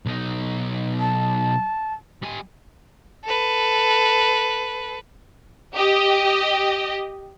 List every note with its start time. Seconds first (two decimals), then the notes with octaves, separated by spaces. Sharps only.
0.06 B1 D#4
1.00 A5
2.22 G3 G#5
3.25 A4 B4
5.74 G4 D#5